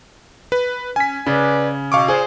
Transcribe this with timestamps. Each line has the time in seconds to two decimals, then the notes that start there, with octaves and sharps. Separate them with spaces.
0.52 B4
0.96 C#4 G#5 B6
1.26 C#3 B4 D5
1.92 B2 F5 C#6 D6
2.08 A#2 G#4 C5